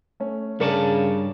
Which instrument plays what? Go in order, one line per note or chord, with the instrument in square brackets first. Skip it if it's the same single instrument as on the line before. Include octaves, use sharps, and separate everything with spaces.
[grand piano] A3 C#4
[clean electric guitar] G2 C#5 A5 [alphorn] C#3 [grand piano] A#4 D5